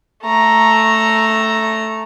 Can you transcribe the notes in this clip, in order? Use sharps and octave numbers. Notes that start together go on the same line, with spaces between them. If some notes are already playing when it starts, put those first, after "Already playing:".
A3 A#5